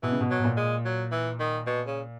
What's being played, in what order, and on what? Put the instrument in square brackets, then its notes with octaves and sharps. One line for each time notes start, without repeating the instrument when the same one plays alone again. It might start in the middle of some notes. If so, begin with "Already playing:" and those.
[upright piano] B2 [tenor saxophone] E3
[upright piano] C#3
B2
[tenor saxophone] F#3
[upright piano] B2
A#2
[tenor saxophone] G#3
F#3
E3
D#3
B2
C#3